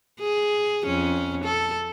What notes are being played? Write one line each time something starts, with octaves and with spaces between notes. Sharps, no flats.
G#4
F2 C#4
A4